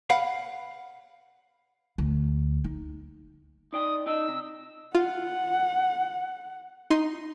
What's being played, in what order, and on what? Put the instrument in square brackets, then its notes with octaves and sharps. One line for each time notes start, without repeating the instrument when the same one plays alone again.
[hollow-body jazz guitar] F5 F#5 B5
[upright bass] D2
D#4
[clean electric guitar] D#4 D5 G5 [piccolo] D#6
[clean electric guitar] D#4 D5 D#5 [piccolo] E6
[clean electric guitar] C3
[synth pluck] F4 [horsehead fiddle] F#5
[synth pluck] D#4 C6